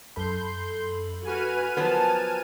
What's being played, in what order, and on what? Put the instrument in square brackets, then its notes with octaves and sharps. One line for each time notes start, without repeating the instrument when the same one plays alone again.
[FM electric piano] F#2 A4 B5 [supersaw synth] C6 G6
[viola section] F#4 B4 [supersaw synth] G#5 F6 D#7
[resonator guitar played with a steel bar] F3 F#3 B3 [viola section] A#4 A5